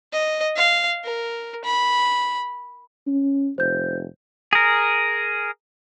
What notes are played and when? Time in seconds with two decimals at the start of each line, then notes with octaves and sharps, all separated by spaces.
0.13 D#5
0.56 F5
1.04 A#4
1.65 B5
3.07 C#4
3.58 F1 C5 G6
4.53 G#4 A#4